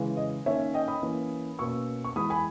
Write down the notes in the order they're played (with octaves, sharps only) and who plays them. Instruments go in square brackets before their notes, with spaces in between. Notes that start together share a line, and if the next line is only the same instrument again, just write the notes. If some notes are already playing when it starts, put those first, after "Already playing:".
Already playing: [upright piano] C#3 E3 G#3
D#5
D#3 A#3 C#4 C#5 E5
D#5 G5
B5 D#6
E3 A#3 C#4
B2 A#3 C#4 C#6 E6
C#6
E3 G#3 B3 B5 D#6
G#5 B5